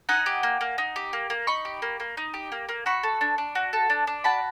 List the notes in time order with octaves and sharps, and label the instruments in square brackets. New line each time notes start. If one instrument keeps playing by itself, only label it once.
[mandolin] D#4 F#5 G#5
G4
A#3
A#3
D#4
G4
A#3
A#3
D#4 B5 C#6
G4
A#3
A#3
D#4
G4
A#3
A#3
F#4 B5 C#6
A4
D4
D4
F#4
A4
D4
D4
F#4 A5 B5